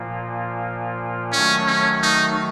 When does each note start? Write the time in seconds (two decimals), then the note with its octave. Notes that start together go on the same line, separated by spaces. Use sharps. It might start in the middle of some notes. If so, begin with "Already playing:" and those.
Already playing: A#2 F3 A#3 F4
1.32 D#3 F#3 A3 C#4
1.67 C#4
2.02 D#4